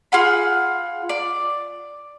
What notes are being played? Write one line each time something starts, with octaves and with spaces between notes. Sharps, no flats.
F4 G#4 F#5 B5
D5